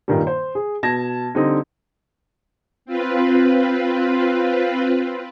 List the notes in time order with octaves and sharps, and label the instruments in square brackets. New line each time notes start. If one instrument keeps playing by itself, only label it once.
[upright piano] G2 A#2 D#3 G3
C5
G#4
B2 A5 G#6 A#6
D3 G3 C4 D#4
[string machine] C4 F4 B4